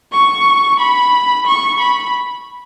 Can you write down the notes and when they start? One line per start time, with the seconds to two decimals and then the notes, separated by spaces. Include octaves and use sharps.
0.13 C#6
0.80 B5
1.46 C#6
1.80 B5